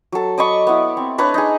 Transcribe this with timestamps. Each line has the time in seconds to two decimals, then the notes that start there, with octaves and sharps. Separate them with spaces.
0.12 F#3 A4
0.38 D5 D#5 B5 C#6
0.67 B3 E4
0.97 C4
1.18 D4 B4 C#5 A#5
1.34 D#4 G#4